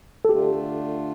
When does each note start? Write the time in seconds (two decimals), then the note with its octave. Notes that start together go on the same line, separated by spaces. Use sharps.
0.25 A4
0.29 D3 A3 D4 F4 G4